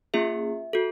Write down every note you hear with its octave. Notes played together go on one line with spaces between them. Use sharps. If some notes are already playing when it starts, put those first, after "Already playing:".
A#3 C#4 F4 G#4 E5
F#4 A4